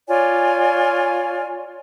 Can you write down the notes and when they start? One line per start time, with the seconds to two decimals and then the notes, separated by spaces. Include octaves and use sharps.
0.08 F4 C#5 D5 G#5